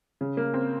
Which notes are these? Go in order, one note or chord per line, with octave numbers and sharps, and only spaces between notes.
C#3
A#3
C4